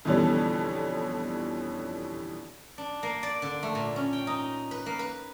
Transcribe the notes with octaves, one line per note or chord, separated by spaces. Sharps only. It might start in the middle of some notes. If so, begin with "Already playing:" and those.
F2 B2 D3 E3 G3 C#4
D4
A#3
D5
D3
A3
A#2
C#4
G5
D#4
B4
A#3
B4